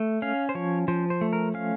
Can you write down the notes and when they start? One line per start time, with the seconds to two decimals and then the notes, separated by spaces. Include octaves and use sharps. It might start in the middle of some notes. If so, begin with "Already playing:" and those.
Already playing: A3
0.22 C#4 F5
0.49 C5
0.55 F3 C#5
0.88 F3 C5
1.10 C5
1.21 A3
1.33 A#4
1.54 C#4 F5